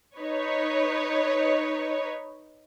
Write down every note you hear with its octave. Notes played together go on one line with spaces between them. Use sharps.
D#4 B4 C#5